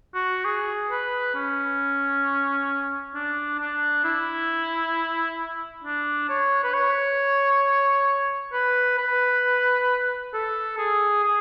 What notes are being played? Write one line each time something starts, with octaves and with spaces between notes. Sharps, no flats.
F#4
G#4
B4
C#4
D4
D4
E4
D4
C#5
B4
C#5
B4
B4
A4
G#4
G#4